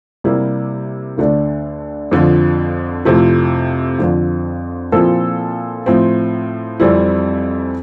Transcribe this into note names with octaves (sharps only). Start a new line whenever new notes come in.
C3 G3 A#3 E4 G4
D2 D3 A3 D4
F2 D3 F3
F2 C3 F3 A3 E4
F2 D3 F3
A#2 F3 C4 E4 A4
A2 F3 C4
F2 E3 G3 C4 E4